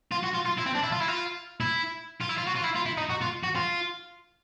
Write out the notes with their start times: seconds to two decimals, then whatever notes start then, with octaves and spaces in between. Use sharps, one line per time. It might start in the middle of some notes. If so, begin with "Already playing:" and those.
0.12 F4
0.24 F#4
0.34 F4
0.46 F4
0.58 E4
0.66 C4
0.75 D4
0.83 E4
0.92 F4
1.00 E4
1.08 F4
1.61 E4
2.21 F4
2.29 E4
2.38 F4
2.47 F#4
2.56 F4
2.64 E4
2.76 F4
2.86 E4
2.98 D#4
3.10 F#4
3.22 F4
3.44 F#4
3.56 F4